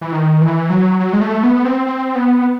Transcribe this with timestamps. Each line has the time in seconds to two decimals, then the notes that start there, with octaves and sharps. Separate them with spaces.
0.01 E3
0.12 D#3
0.41 E3
0.70 F#3
0.99 F#3
1.13 G#3
1.21 A3
1.43 B3
1.65 C4
1.87 C4
2.15 B3